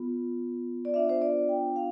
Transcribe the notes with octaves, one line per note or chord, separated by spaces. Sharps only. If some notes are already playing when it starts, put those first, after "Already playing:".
Already playing: B3 F4
D5
B3 D4 F4 E5
C5
D5
G5
F5